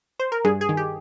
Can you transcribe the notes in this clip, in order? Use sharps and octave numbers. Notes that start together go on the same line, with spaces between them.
C5
A#4
G2 G#4
G#4
D#3
G4